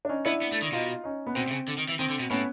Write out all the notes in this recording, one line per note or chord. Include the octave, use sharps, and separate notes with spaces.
D4
C#4 D#4
B3 D4 E4
B3
A3
D#3
B2 D#4 F4
C#4 D#4
B3
B2 C4
C3
C#3
D3
D#3
E3
D#3 C4
D3
B2
A2 B3 C#4